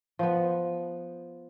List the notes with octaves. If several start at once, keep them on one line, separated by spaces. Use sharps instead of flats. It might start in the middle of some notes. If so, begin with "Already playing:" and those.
F3 B3